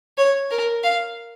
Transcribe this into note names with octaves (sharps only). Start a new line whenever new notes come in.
C#5
A#4
F5